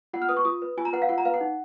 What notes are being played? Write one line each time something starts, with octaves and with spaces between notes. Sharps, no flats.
F4 F#5
F6
B4 D#6
C#6
F4 D#6
B4
F4 G#5
A#5
B4 F#5
F5
F4 F#5
A#5
B4 F5
F#5
D#4